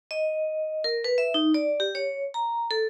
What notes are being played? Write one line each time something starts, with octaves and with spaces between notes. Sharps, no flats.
D#5
A#4
B4
E5
D#4
D5
G4
C#5
A#5
A4